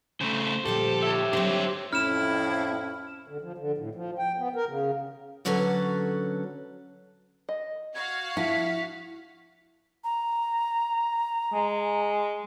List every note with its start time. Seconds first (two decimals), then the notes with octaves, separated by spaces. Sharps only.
0.21 C#3 A3 C5
0.65 A#2 D3 F3 G4 A4
1.02 C#5 E5
1.33 D3 F#3 C4 C5
1.93 F2 A2 C#4 E4 F6 E7
3.28 D3
3.41 F3
3.58 D3
3.78 A2
3.95 F3
4.18 G5
4.38 B3
4.56 A#4
4.67 C#3
5.45 D3 F#3 C#4 F#4 A4 B4
7.49 D#5
7.95 F#4 F5 F#5 G#6
8.37 F3 E4 B6
10.04 A#5
11.53 G#3